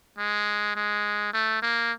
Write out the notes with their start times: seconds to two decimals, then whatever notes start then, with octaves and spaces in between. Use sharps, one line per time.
0.18 G#3
0.76 G#3
1.34 A3
1.62 A#3